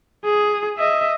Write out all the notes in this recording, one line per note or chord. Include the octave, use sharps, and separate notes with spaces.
G#4
D#5 E5